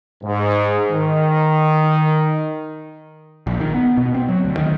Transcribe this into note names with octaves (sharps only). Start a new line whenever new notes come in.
G#2
D#3
A#1
D#3
B3
B2
C4
F#3
D2
D#3